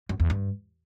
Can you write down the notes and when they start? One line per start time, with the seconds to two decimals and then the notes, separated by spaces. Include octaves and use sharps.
0.09 F#2
0.20 E2
0.30 G2